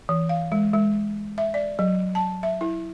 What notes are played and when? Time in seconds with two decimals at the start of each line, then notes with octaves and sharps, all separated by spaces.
0.09 E3
0.29 F5
0.52 G#3
0.74 G#3
1.38 E5
1.54 D5
1.79 F#3
2.15 A5
2.43 E5
2.61 E4